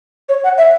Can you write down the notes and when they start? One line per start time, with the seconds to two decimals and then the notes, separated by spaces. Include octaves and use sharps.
0.29 C#5
0.44 F#5
0.58 E5